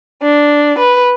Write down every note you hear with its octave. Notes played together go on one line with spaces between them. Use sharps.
D4
B4